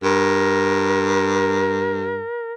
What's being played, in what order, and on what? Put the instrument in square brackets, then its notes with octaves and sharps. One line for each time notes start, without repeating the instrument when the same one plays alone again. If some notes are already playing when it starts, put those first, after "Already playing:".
[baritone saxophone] G2 [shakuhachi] A#4